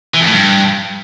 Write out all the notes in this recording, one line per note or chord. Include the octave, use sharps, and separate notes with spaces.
E3
F2
A2
G2